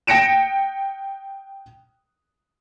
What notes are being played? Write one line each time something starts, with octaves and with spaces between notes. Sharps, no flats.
G5 A#6 C#7 D7 E7